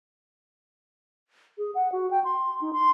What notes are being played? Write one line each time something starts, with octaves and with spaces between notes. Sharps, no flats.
G#4
F#5
F#4
G5
C6
D#4
C6